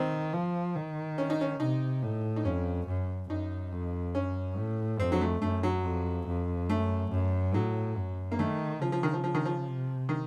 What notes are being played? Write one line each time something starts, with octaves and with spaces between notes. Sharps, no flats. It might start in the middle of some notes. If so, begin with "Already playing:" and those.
Already playing: D#3 C4
F3
D#3
C#4
D#4
C#4
C3 D#4
A2
D#4
F2 C#4
F#2
F#2 D#4
F2
F#2 C#4
A2
F2 C4
F#3
A3
F#2 A3
F#3
F2
F2
F#2 A3
F#2
A2 F#3
F#2
A#3
D#3 A3
C#3 F3
F3
D#3
F3
F3
D#3
F3
C3
D#3